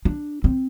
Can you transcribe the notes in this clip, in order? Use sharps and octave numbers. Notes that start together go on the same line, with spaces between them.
D4
C4